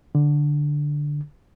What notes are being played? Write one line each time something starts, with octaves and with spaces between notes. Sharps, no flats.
D3